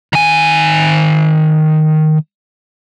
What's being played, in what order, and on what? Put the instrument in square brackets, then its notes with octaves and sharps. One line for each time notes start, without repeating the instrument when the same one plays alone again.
[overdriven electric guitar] D#3 G#5